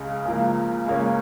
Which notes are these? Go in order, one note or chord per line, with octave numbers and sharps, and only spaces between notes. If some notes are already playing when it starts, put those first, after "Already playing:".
Already playing: C#2 C#3 G#3
C#2 C#3 F3 A#3
C#2 C#3 A#3 C#4